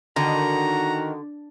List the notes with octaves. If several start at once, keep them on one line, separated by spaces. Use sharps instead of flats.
D3 D#3 F#4 A#5